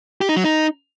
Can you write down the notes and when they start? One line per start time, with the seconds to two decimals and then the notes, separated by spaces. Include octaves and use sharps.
0.21 G4
0.29 D#4
0.36 F#3
0.44 D#4